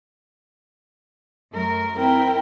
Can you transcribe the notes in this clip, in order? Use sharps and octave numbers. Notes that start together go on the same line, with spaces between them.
F#2 A3 A#4
C4 E4 A#4 G5